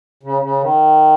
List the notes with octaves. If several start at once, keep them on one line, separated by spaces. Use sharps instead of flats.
C#3
C#3
D#3